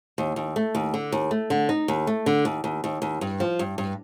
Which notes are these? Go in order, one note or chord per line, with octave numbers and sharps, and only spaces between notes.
D#2
D#2
A3
D#2
D3
D#2
A3
D3
D#4
D#2
A3
D3
D#2
D#2
D#2
D#2
G2
F3
G2
G2